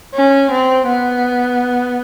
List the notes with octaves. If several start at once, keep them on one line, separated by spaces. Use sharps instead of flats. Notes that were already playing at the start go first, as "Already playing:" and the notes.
C#4
C4
B3